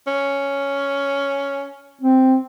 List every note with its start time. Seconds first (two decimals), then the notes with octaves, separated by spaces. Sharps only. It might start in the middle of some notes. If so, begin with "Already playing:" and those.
0.07 C#4
2.01 C4